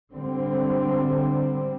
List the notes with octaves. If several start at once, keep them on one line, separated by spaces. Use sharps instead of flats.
D3 G3 C4